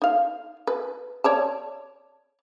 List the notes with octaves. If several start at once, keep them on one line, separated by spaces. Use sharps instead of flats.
D#4 F5
B4
C#5 D5 A5